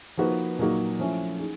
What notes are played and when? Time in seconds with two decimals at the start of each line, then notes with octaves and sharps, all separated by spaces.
0.17 F3 A#3 D#4 F#4 B4
0.59 A#2 F#3 A#3 D#4 F#4
0.99 F3 A3 C#4 E4
1.39 D#4 G#4